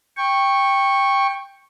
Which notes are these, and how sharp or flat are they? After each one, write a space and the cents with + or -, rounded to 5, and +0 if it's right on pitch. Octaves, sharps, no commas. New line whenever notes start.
G5 +10 C#6 -10